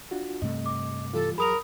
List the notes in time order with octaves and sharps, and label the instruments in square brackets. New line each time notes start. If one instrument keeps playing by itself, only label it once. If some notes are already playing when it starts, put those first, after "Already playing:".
[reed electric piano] D4 F4 F#4
[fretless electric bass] G2 C3 A3 [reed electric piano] D#5
[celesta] D6
[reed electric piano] E3 G3 F4 [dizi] A4
[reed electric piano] E2 F#3 G#4 [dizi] A#4 [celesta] B5 D#6 F7